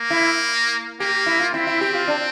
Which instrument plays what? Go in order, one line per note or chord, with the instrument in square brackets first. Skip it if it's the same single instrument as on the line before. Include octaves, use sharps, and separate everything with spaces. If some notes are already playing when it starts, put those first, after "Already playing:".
Already playing: [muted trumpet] A#3
[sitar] E4
[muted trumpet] A#3 [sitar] G4
[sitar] E4
F4
[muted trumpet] C4 [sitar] E4
[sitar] E4
G4
F4
D4